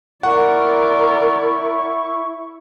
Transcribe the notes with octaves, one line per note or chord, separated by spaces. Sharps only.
E4 A#4 D5 F#5 C#6